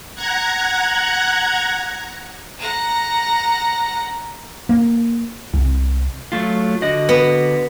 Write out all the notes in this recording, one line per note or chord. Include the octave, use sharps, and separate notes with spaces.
F#5 A#5 F#6 G#6
F#5 A#5
A#3
C2
F#3 A3 F4
D3 F#4 D#5
B3